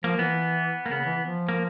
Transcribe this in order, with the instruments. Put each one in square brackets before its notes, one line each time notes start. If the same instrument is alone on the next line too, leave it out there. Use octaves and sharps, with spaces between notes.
[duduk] F3 [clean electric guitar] A#3
[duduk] E3 [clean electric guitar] B3
[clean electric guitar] A#3
[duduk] C#3 [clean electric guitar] B3
[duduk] E3
F3
[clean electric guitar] A#3